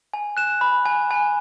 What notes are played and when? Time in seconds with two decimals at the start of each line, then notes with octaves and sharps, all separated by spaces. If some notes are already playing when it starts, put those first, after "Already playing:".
0.14 G#5
0.37 F#6 E7
0.61 B5
0.85 G#5
1.11 G#5